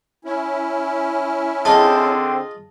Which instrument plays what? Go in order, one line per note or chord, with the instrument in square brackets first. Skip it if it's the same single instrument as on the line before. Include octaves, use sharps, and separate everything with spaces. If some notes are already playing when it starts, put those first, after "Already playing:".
[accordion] C#4 E4
[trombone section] D3 C4 [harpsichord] F4 G#4 D#5 [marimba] A5